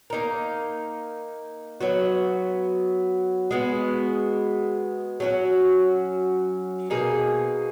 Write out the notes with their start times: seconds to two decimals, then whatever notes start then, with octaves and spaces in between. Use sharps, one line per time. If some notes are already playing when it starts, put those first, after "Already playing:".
0.10 A#3 D#4 A#4
1.81 F#3 B3 F#4
3.51 G#3 B3 F#4
5.20 F#3 C#4 F#4
6.90 B2 A#3 D#4 G#4